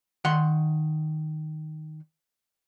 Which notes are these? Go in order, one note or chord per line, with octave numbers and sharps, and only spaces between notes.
D#3 F#5 C6